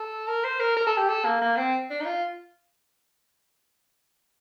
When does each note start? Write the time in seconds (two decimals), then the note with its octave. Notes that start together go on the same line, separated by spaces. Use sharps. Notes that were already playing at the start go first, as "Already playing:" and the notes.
Already playing: A4
0.28 A#4
0.44 C5
0.60 A#4
0.77 A#4
0.87 A4
0.98 G4
1.09 A4
1.25 A#3
1.41 A#3
1.57 C4
1.90 D4
2.00 D#4
2.06 F4